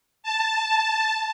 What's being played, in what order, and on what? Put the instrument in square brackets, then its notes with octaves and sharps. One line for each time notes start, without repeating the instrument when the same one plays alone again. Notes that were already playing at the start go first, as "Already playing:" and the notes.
[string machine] A5